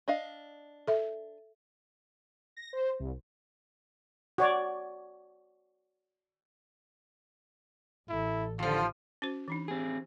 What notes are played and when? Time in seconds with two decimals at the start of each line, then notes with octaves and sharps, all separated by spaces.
0.08 D4 D#5 F5
0.87 A4 E5
2.57 A#6
2.73 C5
2.99 C2
4.38 F#4 C#5 D5
8.09 A1 E4 A4
8.59 D#2 D3 F3 F4
9.22 C#4 F#4 C5
9.48 E3 D4 D#4
9.68 C4 G4 G#4